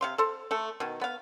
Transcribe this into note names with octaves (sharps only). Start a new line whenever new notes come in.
C3 F5 C6
A4 C5
A3 A4
B2 D#3
B3 F5